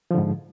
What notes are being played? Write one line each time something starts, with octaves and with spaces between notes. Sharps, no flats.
G#2 D3 F3